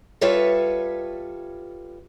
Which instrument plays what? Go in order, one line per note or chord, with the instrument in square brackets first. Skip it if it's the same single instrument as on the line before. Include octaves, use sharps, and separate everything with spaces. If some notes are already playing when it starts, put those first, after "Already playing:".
[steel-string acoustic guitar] G3 F4 A4 B4 C#5 E5